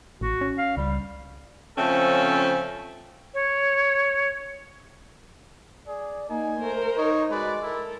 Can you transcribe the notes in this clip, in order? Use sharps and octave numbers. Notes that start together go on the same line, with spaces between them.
A1 F#4
C#4
F5
C#2 G3
C#3 F3 A3 C4 C#4 A4
C#5
G#4 D5
A#3 D#4 G#5
A3 A#4 C5
D#4 C#5
G#3 F#4 B4 D5
E4 A4 A#4